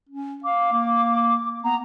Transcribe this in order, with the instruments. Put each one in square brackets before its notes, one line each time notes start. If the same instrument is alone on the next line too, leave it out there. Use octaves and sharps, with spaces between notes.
[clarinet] C#4
[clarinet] F5 [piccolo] D6
[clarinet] A#3
[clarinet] B3 [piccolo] A#5